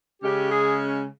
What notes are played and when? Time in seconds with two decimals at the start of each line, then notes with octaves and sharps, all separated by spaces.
0.22 C#3 G#3 C#4 G4
0.49 G#4